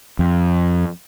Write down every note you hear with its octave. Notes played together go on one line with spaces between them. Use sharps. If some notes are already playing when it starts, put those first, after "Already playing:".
F2